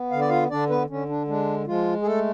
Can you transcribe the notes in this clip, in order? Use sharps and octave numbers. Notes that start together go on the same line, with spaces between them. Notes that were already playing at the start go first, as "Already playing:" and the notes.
Already playing: B3
D3 F5
D5
F4 F5
D3 D4 D5
B3 B4
D3 C#4
D4
G#3 D4
F3 G#3 F4
G#4
A3 A4